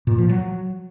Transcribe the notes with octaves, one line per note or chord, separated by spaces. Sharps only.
A#2
F3
F#3